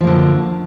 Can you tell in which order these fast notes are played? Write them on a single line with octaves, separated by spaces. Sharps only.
F3 A#3 D3 F#2